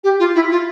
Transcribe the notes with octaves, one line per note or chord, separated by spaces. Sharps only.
G4
F4
E4
F4